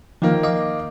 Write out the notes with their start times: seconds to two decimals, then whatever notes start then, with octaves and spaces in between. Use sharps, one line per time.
0.22 D#3 F3 A#3
0.43 D#5 F5 D6